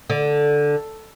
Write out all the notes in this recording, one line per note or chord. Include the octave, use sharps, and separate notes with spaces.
D3